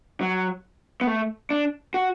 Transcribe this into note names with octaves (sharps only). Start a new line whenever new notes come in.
F#3
B3
A3
D4
F#4